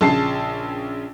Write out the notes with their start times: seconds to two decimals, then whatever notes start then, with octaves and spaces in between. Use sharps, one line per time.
0.01 A#1 C#3 A5 C7